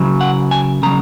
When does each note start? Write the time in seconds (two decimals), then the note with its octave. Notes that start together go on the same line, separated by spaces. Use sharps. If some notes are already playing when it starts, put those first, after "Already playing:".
Already playing: C#3 F#3
0.21 F#5
0.51 G#5
0.83 C#3 F#3 A#5